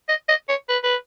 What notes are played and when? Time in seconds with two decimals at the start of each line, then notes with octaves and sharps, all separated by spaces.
0.08 D#5
0.28 D#5
0.49 C#5
0.69 B4
0.83 B4